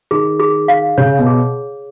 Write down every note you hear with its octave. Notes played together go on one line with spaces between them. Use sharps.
D#3 G#4
G#4
F5
C#3 C#5
B2
G#4